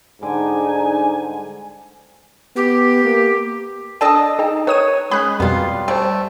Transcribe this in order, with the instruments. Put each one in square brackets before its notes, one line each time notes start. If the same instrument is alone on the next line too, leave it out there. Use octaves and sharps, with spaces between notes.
[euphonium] G#2 [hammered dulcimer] D3 G3 [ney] D#4 [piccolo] G#5
[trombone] B3 [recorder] G4
[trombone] A#3
[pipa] D4 A4 D#5 [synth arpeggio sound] G5 D#6
[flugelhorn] D#4 [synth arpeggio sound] G#4 G5 A5
[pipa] D#3 [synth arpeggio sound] B4 D#6 D#7 [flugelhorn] C#5
[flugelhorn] G#3 [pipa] C#4 G#4 [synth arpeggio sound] B5 F#6 B6
[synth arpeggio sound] F2 B2 [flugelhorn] G3 [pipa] B3 F4
[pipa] A3 [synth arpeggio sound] C5 C#5 G5